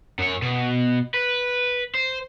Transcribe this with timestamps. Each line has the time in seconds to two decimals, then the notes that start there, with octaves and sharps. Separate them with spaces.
0.19 F#2 C#5
0.42 B2
1.14 B4
1.94 C5